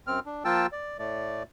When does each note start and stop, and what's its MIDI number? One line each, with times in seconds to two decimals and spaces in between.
0.07 0.20 42
0.07 0.20 60
0.07 0.20 89
0.26 0.43 62
0.45 0.66 53
0.45 0.66 58
0.45 0.66 65
0.45 0.66 79
0.45 0.66 81
0.45 0.66 88
0.72 0.97 74
0.99 1.43 45
0.99 1.43 57
0.99 1.43 74